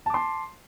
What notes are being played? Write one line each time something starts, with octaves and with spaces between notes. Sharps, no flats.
A5 C6 D6